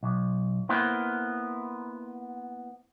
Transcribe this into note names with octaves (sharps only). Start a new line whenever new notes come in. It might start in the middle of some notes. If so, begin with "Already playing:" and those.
B1
A#3 B3 E4 C5